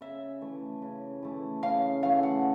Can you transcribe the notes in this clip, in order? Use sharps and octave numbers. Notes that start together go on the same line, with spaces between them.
C#3 E5
E3 A3
C#3
E3 A3
C#3 F5
E3 A3 F5
F#5